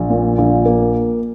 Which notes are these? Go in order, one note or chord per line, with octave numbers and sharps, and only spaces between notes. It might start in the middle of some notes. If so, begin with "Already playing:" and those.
Already playing: A#1
A#2
A#1
A#3